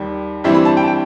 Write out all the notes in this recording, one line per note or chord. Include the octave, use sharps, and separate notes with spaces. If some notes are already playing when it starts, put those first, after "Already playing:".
Already playing: D#2 D#3 G3
G2 E3 G3 C4 E4 E5
B5
A5
G5
A5
G5